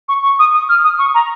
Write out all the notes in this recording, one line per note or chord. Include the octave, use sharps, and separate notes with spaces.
C#6
C#6
D#6
D#6
F6
D#6
C#6
A#5